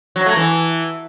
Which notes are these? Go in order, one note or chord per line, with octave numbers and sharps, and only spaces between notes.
F#3
A3
E3